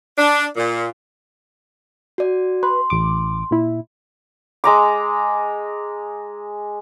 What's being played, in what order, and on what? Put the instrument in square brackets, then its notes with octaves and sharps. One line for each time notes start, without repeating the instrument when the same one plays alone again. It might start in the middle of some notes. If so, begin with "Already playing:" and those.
[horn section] D4
A#2
[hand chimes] F#4 D5
[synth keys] B4 [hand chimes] C6
[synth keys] A1 D6
A#2 E4
[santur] G#3 A#5 D6